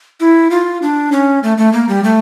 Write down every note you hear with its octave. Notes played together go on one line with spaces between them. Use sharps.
E4
F4
D4
C#4
A3
A3
A#3
G3
A3